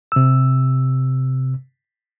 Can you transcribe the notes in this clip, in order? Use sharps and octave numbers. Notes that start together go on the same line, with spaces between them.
C3 E6